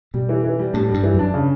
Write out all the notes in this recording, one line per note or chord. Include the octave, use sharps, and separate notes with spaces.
B2 G3
E3
E3
G3
A2 D4
G3
G2
E3
F#2 D4
C#3